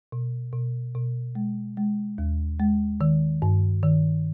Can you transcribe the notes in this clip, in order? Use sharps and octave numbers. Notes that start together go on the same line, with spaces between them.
B2
B2
B2
G#3
G#3
D#2
G#3
D#3
G2
D#3